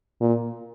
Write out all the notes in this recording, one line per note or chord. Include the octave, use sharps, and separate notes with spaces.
A#2